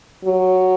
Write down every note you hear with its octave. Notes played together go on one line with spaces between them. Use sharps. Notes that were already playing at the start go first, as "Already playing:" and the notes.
F#3